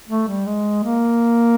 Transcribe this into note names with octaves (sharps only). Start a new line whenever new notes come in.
A3
G3
G#3
A#3